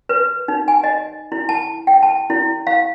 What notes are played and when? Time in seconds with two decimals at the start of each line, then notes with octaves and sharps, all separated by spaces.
0.09 B4
0.48 D#4
0.68 G#5
0.84 D#5
1.32 E4
1.49 A5
1.87 G5
2.03 A5
2.30 E4
2.67 F5